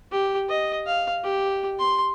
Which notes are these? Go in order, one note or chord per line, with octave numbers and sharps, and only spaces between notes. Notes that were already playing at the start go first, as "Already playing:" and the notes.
G4
D#5
F5
G4
C6